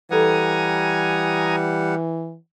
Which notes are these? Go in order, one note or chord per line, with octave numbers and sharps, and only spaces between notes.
E3 G3 A4 B4 F#5 G#5 A#5 D#6